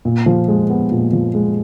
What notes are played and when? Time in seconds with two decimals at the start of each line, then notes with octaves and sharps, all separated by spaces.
0.05 A#2
0.26 F3
0.48 G#3
0.70 B3
0.91 A#2
1.13 F3
1.34 G#3